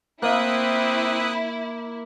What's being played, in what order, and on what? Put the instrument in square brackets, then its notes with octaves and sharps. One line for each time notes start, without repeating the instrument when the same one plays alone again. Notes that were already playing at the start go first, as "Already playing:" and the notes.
[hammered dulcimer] A#3 [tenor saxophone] C4 [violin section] E4 [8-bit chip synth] E5 D#6 F#6